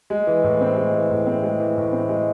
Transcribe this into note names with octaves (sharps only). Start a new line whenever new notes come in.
G#3
E3
A2
C4
G#3
E3
A2
C4
G#3
E3
A2
C4
G#3